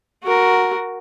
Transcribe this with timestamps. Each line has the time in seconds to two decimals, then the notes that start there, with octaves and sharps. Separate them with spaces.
0.23 F#4 A#4